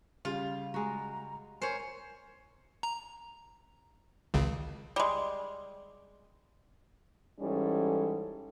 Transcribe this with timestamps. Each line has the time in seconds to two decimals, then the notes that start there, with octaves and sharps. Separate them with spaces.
0.25 C#3 G3 F4
0.74 G#3 F#4 A#5
1.62 A#4 C5 C#5 G#5
2.83 A#5
4.34 G#1 C#2 C#3
4.96 G3 G#3
7.40 G#2 E3 G3 C#4 A4